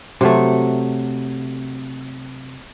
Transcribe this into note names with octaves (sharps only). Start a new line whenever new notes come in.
C3 F#3 A3